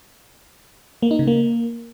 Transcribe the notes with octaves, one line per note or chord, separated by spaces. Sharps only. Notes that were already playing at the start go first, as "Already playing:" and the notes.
A#3
D#4
C#3
A#3